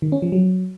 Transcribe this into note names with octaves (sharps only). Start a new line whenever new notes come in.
D#3
C#4
F3
F#3